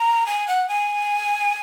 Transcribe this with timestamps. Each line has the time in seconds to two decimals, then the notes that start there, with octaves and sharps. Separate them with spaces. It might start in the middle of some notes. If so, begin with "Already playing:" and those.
Already playing: A#5
0.26 G#5
0.47 F#5
0.68 G#5